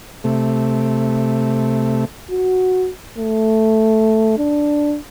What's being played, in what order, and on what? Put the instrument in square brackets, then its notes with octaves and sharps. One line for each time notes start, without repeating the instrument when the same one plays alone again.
[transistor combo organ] C3 A3
[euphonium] F#4
A3
D4